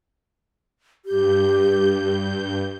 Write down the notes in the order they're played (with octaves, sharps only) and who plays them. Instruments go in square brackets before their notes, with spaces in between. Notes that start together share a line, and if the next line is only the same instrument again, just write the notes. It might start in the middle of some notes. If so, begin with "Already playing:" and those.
[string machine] G2 G6 [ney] G4